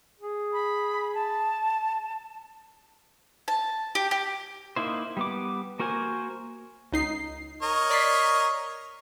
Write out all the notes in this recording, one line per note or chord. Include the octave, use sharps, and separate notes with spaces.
G#4
B5
A5
A5
G4
G4
A#3 D#4 E4 C5
G3 B3 D6
A#3 F#4 A#4 C5 G#5
C#2 D#4 C7
A#4 C#5 D#5
D5 B6 C7